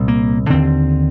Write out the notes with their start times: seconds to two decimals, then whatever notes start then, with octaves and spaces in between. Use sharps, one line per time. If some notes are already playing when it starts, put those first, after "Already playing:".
Already playing: C2 A#2
0.08 A#3
0.50 D#2 D3 C4